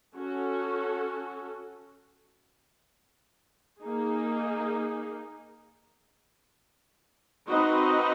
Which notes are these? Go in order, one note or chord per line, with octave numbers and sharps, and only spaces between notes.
C#4 F#4 A4
A#3 D#4 G#4
C4 D#4 F#4 B4 D#5